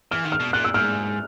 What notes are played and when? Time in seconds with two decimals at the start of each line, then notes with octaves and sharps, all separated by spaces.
0.11 E3 F6
0.25 D#3
0.32 F6
0.40 B2
0.53 A#2 F#6
0.64 E6
0.74 G#2 F6